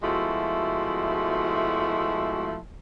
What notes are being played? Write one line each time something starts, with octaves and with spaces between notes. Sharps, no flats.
B2 F3 G#3 A3 E4 F#4